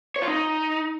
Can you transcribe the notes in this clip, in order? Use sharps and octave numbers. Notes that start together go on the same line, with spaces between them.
C#5
F4
D#4